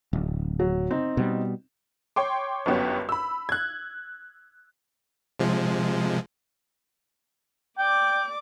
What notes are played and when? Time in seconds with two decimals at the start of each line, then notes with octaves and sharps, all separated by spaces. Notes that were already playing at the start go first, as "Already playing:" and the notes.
0.13 D1
0.60 F#3
0.91 C4 D#4
1.17 B2 G3
2.16 C#5 G5 C6 D6
2.66 G1 F#2 B3 G4 C#5
3.09 B5 E6
3.49 F#6 G#6
5.39 C3 F3 G#3
7.78 D5 G5 D6